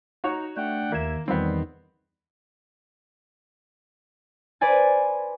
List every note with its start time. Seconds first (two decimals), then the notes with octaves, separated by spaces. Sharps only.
0.24 D#4 F#4 C#5 A#5
0.57 A3 D4 F#5 G5
0.92 D#2 A#3 E5 G#6 E7
1.28 E2 D#3 G3 B3 C4
4.61 B4 C5 D5 G#5 A6